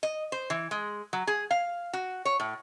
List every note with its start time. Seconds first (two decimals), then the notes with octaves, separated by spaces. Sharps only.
0.03 D#5
0.32 C5
0.50 E3
0.71 G#3
1.13 F#3
1.27 G#4
1.51 F5
1.93 F#4
2.25 C#5
2.40 A2